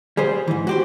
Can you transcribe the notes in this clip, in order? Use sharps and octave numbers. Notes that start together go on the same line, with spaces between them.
G3 G#4 C5
G#2 E3
F#4 G4 C5